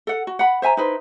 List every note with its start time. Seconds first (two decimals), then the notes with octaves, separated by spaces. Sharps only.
0.07 A4 F#5
0.27 F#4
0.39 F#5 B5
0.62 C5 E5 G#5 A#5
0.77 D#4 E4 B4 C5